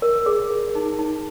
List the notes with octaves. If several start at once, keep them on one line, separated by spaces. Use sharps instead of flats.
A#4
G#4
G#4
D#4
D#4